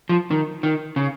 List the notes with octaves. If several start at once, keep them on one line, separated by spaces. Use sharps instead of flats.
F3
D#3
D#3
C#3